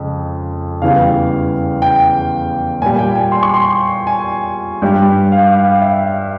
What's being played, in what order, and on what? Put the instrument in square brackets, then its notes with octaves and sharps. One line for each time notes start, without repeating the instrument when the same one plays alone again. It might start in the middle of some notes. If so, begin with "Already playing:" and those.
Already playing: [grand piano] F2 C#3 G#3
E2 C#3 E3 G3 F5
G5
A#2 G#5
G3
G5
G#5
C6
C#6
C6
G#5
G2 G3
F5
F5
E5